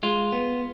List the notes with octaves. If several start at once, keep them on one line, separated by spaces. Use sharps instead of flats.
G#3 F4
B3